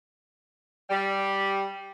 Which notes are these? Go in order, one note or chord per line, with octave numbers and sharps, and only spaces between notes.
G3